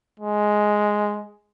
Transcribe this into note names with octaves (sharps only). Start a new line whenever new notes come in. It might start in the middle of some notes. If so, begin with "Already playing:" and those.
G#3